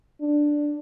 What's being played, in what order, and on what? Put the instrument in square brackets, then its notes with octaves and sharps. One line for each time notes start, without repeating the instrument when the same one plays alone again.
[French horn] D4